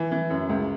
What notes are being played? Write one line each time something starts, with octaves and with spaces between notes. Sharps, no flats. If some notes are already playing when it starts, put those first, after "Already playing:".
Already playing: E3
E3
F#2
C#2